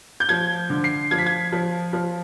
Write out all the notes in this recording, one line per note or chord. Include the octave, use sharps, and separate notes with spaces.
G6
F3 G#6
D3
C7
F3 G#6
B6
G#6
F3
F3